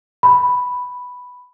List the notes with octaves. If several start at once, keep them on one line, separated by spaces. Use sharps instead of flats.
B5